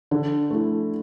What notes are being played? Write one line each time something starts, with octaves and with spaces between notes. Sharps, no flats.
D3
A3 E4